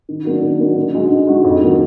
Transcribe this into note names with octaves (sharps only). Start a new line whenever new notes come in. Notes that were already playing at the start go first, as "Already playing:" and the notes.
D#3
F#3 A#3 D4
D#3
F#3 A#3 D4
D3
G#3 D#4 F#4
D3
G#3 D#4 F#4
F2
D#3 F#3 A#3